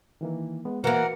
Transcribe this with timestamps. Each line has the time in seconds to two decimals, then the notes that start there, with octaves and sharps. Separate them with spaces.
0.21 D#3 E3 A#3
0.65 G#3 B3
0.84 E3 A#3 F#4 A#4 B4 F#5